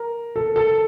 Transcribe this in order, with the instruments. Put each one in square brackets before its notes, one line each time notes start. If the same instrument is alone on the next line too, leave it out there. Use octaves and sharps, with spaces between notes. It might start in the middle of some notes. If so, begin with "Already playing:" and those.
Already playing: [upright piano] A#4
A4
A4